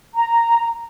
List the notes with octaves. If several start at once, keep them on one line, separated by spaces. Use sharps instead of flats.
A#5